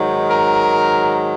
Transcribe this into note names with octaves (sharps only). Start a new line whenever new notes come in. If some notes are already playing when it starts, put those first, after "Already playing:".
Already playing: G#2 D#3 F#3
A#4